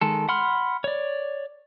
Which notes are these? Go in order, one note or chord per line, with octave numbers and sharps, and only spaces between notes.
D#3 G#3 A4
F#5 B5 C6 F6
C#5 D5